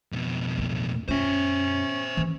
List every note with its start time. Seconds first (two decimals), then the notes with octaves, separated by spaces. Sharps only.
0.12 F2 B2
0.58 E2 A2
1.08 F#2 C#4 F4 C5 E5
2.17 D#3 E3